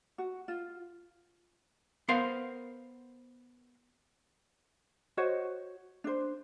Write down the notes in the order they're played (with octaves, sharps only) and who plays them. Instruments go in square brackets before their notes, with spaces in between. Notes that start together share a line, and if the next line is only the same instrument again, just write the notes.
[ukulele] F#4
F4
[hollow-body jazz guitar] B3 A#4 C5 F5 C6
[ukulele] F#4 C5 C#5 D#5
D4 C5